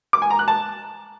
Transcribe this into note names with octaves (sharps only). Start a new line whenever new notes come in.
D6
G#5
A#5
F#6
A5